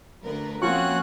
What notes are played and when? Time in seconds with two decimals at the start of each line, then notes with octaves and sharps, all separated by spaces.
0.23 D2 A#4 B4
0.62 F3 A#3 C4 C#4 F4 F#4 C#6 F#6